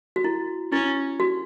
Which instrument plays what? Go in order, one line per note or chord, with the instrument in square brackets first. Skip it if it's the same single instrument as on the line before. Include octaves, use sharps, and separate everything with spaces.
[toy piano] F#4
E4
[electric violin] C#4 [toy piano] E4
[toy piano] F#4